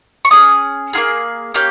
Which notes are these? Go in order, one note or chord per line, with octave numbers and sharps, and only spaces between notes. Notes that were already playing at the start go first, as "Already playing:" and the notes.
C#6
C#4 G#4 D#6
A#3 F4 G#4
A#3 C#4 G4 G6